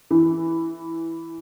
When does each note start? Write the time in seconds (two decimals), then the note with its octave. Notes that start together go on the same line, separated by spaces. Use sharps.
0.11 E3